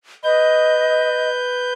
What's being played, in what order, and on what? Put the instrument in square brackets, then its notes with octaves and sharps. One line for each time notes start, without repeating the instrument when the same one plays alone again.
[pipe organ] B4 G6 [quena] D#5